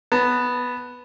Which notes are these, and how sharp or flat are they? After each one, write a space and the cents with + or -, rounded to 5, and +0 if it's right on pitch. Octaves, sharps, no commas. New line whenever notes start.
B3 +0 A5 +25